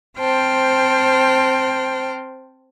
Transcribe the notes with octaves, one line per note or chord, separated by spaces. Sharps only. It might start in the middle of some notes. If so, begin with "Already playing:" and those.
C4 C5 G5 A5 F6